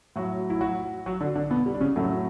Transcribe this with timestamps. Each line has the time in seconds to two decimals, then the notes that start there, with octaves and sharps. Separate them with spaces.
0.16 A2 F#3 F#4
0.50 E4
0.61 F#3 F#4
1.06 F#3 F#4
1.20 D3 D4
1.35 D3 D4
1.50 B2 B3
1.66 G3
1.74 D4
1.81 C#3 C#4
1.96 A2 F#3 A3